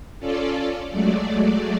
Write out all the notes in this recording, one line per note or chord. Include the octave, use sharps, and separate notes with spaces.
C#4 F4 A4 D5
F#3 G#3 A3 D5